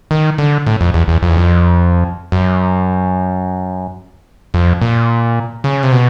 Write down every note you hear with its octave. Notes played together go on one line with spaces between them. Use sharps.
D#3
D3
A2
F2
E2
E2
F2
E2
F2
F#2
F2
A#2
C#3
C3
B2